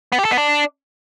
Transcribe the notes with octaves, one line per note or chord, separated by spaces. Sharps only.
B3
G4
A4
B3
D4